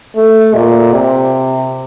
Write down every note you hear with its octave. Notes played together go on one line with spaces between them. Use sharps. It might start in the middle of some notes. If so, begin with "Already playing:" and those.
A3
A#2
C3